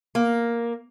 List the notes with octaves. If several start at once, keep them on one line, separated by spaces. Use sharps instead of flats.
A#3